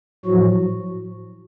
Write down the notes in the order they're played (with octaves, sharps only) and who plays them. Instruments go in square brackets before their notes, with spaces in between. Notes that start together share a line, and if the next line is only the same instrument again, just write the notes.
[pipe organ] A2 F3 F#3 F#4